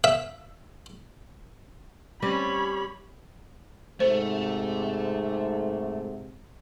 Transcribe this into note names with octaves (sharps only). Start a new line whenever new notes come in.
E5
G3 C4 C#4 C#5 B5
G#2 C3 A3 C5